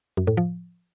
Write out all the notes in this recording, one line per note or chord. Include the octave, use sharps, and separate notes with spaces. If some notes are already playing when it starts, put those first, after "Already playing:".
F#2
A2
F3